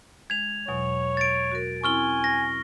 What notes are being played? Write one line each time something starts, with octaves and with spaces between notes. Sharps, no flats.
G#3 G#6 F7
E2 B2 F#3 C#5
A6 D7
F#4 A#4
C4 C#4 E4 G#5 C#6 F6 G7
A#6